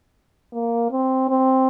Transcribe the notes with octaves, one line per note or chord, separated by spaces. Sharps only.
A#3
C4
C4